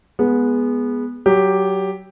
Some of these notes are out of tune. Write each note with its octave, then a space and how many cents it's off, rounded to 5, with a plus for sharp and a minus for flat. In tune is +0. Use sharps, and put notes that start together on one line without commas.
G#3 +0 B3 -15
F#3 +20 G4 +0